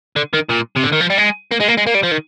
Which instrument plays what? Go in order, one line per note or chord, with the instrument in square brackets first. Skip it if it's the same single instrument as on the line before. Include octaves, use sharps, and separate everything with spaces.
[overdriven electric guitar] D3
D#3
A#2
C3
D3
D#3
F3
G3
G#3
A#3
G#3
A#3
G#3
A#3
G3
F3
D#3